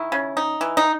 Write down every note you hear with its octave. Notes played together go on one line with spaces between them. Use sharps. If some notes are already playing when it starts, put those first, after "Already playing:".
Already playing: D#3 E4
C#3
D#4
E3
D#4